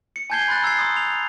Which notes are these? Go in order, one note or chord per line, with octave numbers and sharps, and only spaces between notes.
C#7
G#5 A5 G6 G#6 C7 G7
B5 C6 F#6 A6
A#5 E6 G#6 C7
C6 D#6
F7